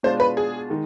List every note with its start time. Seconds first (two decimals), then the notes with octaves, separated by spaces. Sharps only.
0.03 B2 G#3 D4 F4 C5
0.20 B4
0.37 G#4
0.70 D#3 G#3 D#4